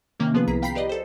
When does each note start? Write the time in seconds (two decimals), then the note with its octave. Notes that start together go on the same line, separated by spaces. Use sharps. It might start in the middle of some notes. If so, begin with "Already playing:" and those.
0.20 C3 D#3 A#3 C#4
0.34 F3 B3 F4 G#4 B4
0.47 C2 E4 G#4 A#5 B6
0.62 F5 G5 A#5 B5 B6 C7
0.75 G4 B4 D5 D#5
0.89 A4 C5